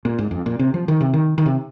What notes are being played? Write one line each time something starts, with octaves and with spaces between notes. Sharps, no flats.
A#2
G#2
F2
A#2
C3
F3
D#3
C3
D#3
D#3
C3